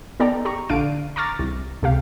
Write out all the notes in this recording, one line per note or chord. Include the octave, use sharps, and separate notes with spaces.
B3 D#4 A4 D5 G5 A#5
G4 A#5 C#6
A#1 D3 D5 F5 D7 D#7
A#5 C#6 D6 F6 A6 A#6
C2
C#2 C3 G4 F5